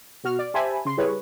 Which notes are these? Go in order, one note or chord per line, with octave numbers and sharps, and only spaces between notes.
B2 F#4 F6
D5
G4 C5 E5 G#5 A5 B5
C#3 C6
G3 E4 G#4 B4 C#5